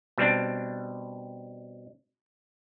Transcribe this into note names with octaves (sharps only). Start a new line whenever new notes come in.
B2 G3 C4 D4